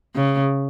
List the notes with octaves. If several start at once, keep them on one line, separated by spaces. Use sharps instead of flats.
C#3